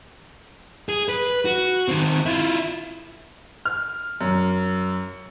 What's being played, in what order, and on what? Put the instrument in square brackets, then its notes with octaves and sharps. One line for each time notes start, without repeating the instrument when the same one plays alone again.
[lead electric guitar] G#4
B4
F#4
D#3 C4
E4 F4
[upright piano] F6
F#2